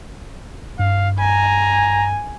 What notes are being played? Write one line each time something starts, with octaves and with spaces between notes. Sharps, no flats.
G2 F5
G#5 A#5